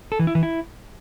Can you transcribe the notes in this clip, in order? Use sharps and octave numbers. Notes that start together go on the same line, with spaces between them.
A4
E3
E4
E3
E4